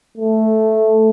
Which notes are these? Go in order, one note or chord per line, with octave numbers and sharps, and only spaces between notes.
A3